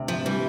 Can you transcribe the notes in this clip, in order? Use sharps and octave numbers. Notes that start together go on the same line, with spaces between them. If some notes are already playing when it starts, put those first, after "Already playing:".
Already playing: D2 C3
F3
E3 G3